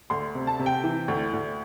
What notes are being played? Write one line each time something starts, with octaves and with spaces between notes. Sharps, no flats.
D2 C6
C3
A5
C3
G5
E3
D2
D2